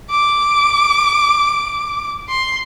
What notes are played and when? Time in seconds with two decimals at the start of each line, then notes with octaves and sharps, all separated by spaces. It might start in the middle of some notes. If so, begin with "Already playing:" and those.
0.11 D6
2.29 C6